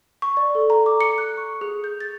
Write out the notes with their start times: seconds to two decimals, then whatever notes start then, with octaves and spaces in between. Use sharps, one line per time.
0.22 C#6
0.37 D5
0.55 A4
0.70 A#5
0.86 D6
1.01 C#7
1.18 F#6
1.37 C#6
1.61 G#4
1.84 G6
2.01 A6